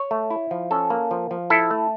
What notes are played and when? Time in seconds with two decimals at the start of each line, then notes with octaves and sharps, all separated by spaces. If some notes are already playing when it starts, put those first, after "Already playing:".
Already playing: C#5
0.11 A3
0.30 E4
0.51 F3
0.71 C#4 A4
0.90 A#3
1.11 F3
1.31 F3
1.50 E4 A4
1.71 A3